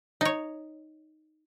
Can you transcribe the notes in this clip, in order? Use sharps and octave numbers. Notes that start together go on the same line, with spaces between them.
D#4 C#5